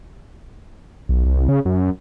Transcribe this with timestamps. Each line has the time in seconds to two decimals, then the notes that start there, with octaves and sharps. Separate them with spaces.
1.09 B1
1.26 C2
1.48 C#3
1.65 F#2